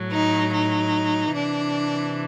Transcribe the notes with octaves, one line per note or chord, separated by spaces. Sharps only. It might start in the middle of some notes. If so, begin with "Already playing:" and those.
Already playing: A2 F#3
D#4
D#4
C3 E3 D4